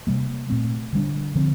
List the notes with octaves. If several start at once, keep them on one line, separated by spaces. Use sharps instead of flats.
C3 G3 A#3
A#2 A3 C4
D3 G3 D4
D3 F3 C4